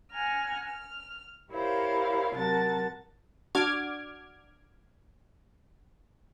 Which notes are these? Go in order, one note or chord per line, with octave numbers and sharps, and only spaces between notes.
F#5 G#5 A#5 F6
F6
E4 G4 A#4 C5 C#5 F5
C3 F#3 A#4 F#5 A5 A6
D4 F#4 D6 F6 G#6